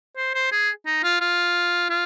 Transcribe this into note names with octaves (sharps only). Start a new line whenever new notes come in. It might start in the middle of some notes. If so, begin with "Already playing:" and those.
C5
C5
G#4
D#4
F4
F4
F4